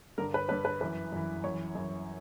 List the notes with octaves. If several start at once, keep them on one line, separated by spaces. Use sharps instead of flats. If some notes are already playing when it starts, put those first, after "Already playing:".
G2 D3 A#4
B4
G2 D3 B4
B4
F#2 E3 B4
F#2 E3
F#2 E3 C#5
F#2 E3